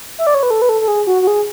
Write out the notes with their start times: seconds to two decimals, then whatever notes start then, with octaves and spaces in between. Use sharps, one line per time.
0.19 E5
0.27 D5
0.34 C#5
0.43 B4
0.51 A4
0.62 B4
0.69 A4
0.81 A4
0.88 G#4
1.07 F#4
1.22 F#4
1.27 G#4